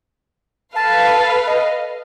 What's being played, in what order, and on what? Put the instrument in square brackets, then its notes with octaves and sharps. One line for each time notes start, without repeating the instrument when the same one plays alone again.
[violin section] A4 B4 F5 [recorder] A5
[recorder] D#5